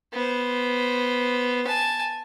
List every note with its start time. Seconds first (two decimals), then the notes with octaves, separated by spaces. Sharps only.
0.13 B3 C5
1.67 G#5 A5